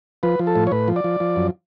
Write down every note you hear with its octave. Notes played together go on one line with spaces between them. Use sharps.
F3 B4
F3
A4
A2
C#5
A2 B4
F3
D5
F3
F3
F#2